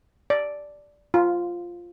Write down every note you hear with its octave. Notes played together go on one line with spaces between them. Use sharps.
D5
F4